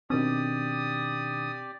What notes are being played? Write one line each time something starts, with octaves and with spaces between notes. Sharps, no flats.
B2 D#3 C4 D4 G4 D5 D#6